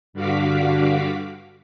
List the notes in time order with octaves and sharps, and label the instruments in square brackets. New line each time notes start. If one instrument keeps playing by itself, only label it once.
[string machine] G2 D3 F#4 F5 D6 B6